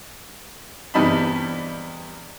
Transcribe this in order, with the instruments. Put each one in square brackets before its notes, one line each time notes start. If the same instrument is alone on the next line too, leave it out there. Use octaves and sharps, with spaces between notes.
[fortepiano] E2 G2 C3 D#4 A5 B5